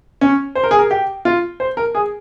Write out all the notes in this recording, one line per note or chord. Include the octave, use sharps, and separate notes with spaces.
C#4
C5
A#4
G#4
A#4
G4
F4
C5
A#4
G#4